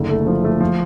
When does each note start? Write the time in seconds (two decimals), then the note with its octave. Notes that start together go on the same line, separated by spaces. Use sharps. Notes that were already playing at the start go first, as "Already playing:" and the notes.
Already playing: F#1 D3
0.09 A3
0.27 F3
0.44 A3
0.60 F3